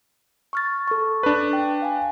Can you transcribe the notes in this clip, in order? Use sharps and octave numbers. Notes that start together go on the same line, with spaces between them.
C#6 F6 A6
A4 C#6
D4 B4
G5
F5 G#5